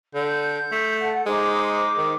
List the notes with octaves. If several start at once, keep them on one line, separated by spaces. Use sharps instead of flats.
D3 G6
A3
A4 F#5
G#3 D#4 C5 D6
D#3